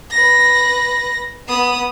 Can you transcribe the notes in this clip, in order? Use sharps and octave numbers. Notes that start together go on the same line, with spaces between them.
B4 A#6
B3 D#6